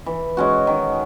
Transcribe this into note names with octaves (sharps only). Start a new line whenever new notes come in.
E3
G#3 C#4 F#4
D#3